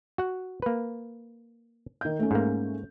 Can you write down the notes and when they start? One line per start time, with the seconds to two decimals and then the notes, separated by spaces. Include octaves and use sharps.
0.18 F#4 F#5
0.62 A#3 B4
2.01 D#3 G6
2.19 A3 C#4
2.31 G#2 A#3